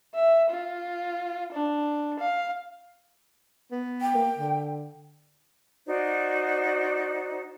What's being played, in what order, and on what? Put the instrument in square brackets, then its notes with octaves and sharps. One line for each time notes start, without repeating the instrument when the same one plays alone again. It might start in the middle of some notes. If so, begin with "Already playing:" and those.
[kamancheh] E5
F4
D4
F5
[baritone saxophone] B3
[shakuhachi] G5
[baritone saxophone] A#3
D3
[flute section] D#4 F#4 C5 D5